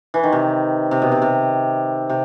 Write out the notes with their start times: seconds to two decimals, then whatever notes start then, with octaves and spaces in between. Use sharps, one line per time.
0.14 E3
0.23 D#3
0.32 C3
0.91 C3
1.02 B2
1.11 C3
1.22 C3
2.09 C3